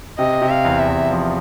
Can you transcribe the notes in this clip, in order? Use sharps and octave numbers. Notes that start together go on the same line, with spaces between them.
C3 D#5
C3
F5
E2
E5
E2
F3